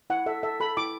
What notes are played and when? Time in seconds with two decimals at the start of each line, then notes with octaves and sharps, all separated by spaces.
0.10 E4 F#5
0.26 A4 E5
0.43 A4 E5
0.60 A4 B5
0.77 E4 D6